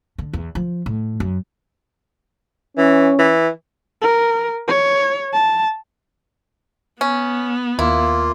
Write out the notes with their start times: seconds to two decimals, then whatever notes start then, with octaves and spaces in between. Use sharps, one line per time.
0.18 D3
0.33 E2
0.55 F3
0.86 A2
1.20 F#2
2.77 E3 C#4
3.19 E3
4.01 A#4
4.68 C#5
5.33 A5
7.01 B3 C#4
7.79 D#2 A#3 E4 F4